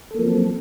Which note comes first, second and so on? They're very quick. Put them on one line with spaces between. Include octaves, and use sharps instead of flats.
A4 A#3 F3 C4 F#3